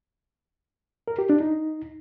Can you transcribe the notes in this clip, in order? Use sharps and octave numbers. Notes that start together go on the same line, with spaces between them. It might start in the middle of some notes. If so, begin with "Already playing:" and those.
A#4
G4
D4
D#4